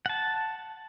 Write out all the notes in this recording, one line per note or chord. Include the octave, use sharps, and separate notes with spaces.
F#5 A5